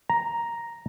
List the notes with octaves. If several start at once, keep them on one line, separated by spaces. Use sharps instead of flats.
A#5